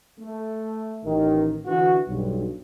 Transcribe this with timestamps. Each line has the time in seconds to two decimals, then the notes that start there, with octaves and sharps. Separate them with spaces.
0.19 A3
1.04 A1 D#3
1.65 D3 E3 F#4
2.06 B1 G2